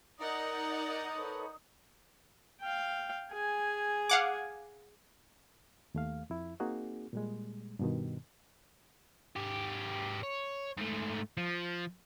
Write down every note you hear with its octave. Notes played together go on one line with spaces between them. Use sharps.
D#4 A#4 D5 F#5 A#5 D#6
A4 B4 C#5
F5 G5
G#4 G#5
F5 F#5 D6
D#2 A3 F5
F2 E4
A#3 C4 D#4 F#4 G#4
A#2 G3 G#3
G2 B2 D#3
G#2 G4
C#5
G#2 A3
F3